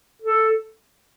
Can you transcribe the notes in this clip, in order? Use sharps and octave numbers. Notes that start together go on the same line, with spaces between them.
A4